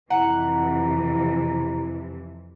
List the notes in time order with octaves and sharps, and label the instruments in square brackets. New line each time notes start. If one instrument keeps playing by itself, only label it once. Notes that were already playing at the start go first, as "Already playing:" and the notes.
[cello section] F2 C3 E3 [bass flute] E4 [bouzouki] F#5 [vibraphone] A#5